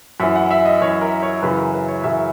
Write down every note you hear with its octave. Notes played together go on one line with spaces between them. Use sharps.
F#2 E3 E5
F#5
E5
D#5
F#2 E3 C#5
A#4
C#5
F#2 C#3 E3 B4
A#4
B4
C#5
F#2 C#3 E3 E5